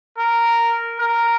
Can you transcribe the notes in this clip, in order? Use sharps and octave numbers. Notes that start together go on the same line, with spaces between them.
A#4
A#4